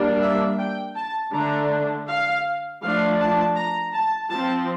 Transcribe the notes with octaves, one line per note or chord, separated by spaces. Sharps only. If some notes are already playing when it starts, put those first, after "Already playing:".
Already playing: G3 A#3 D4
E5
G5
A5
D3 A3 D4 A#5
F5
F3 A3 D4 F5
A5
A#5
A5
F3 C4 A5